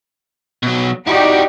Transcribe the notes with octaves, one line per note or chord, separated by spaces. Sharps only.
B2 F#3
D#4 E4 F#4 G4 D5